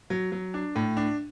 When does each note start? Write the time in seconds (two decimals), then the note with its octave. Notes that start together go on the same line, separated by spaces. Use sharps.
0.10 F#3
0.32 F#3
0.54 D4
0.75 A2
0.97 D4